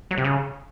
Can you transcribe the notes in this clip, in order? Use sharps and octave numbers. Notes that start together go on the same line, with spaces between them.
F#3
C3
C#3